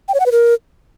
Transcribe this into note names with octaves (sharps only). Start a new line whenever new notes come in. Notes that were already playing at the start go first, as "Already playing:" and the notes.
G5
C#5
F#5
B4
A#4